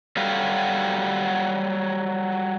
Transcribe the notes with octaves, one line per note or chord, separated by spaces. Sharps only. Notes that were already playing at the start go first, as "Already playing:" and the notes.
F#3 G3 F#4 G4 A4 F5